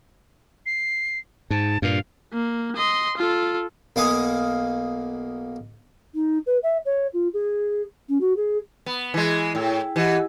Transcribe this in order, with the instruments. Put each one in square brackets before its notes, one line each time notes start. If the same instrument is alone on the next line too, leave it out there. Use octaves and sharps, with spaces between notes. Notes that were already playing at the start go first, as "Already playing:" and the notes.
[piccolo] C7
[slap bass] G#2 [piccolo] A5
[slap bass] G2 A#2 [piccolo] F5
[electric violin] A#3
D#5 C6
F4 A4
[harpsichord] B1 A#3 F5 F#5 G#5 D#6
[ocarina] D#4
B4
E5
C#5
F4
G#4
C#4
F#4
G#4
[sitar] B3
E3 G#3
[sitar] A2 [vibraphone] E4 G5
[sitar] E3 [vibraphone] G4 D#5 F#5